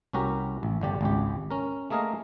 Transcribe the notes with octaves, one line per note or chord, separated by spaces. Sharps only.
C2 C#4 F#4 G4 A#4
A1
G1 D3 G4
G#1 C#2 G4
C#4 A#4
A3 A#3 G#4 A#4 D#5 F5